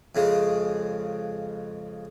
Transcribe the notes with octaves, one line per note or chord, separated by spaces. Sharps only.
F2 C#3 G#3